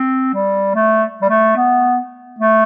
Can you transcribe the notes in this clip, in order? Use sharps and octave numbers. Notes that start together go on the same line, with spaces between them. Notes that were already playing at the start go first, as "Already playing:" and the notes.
Already playing: C4
G3
A3
G3
A3
B3
A3